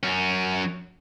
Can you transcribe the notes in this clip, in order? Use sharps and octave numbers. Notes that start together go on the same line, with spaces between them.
F#2 C#4